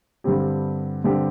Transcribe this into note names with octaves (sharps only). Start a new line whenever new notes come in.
G2 D3 G3 C4 G4
G2 D3 G3 C4 G4